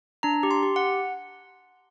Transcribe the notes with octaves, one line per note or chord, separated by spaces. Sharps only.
D4 A#5
G4
C6
G4
F#5